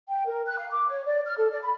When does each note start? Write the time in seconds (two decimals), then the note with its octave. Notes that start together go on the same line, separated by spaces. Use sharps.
0.09 G5
0.26 A#4
0.47 F#6
0.59 F5
0.72 D6
0.89 C#5
1.05 D5
1.26 F6
1.38 A4
1.51 D5
1.63 B5